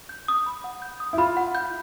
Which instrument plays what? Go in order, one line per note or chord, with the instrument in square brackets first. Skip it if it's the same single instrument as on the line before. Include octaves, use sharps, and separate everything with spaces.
[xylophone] G6
D#6
B5
F#5
G6
D#6
[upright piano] E4
[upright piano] F4 [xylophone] B5
[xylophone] F#5
G6